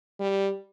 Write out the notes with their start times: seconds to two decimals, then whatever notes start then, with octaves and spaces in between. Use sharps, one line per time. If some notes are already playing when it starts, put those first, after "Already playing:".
0.20 G3